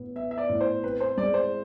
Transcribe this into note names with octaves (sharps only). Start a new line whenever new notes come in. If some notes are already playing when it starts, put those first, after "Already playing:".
Already playing: A2 B3
B3 E5
E5
D5
A2
C5
C4 B4
C5
G#3 D5
C5